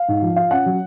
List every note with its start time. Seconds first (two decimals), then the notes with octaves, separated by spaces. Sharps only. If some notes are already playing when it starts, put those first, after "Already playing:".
Already playing: F5
0.08 G#2
0.22 F3
0.36 F4 F5
0.51 C#4 F#5
0.66 F#3